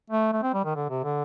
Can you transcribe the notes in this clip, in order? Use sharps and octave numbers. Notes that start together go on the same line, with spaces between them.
A3
A3
C4
G3
D#3
D3
C3
D3